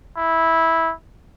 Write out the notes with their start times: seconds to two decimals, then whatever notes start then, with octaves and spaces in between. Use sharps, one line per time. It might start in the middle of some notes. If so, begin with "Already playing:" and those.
0.17 E4